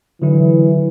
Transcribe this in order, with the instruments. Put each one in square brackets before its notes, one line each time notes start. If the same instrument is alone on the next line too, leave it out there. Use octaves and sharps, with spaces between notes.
[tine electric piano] D3 F#3 E4 [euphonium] E3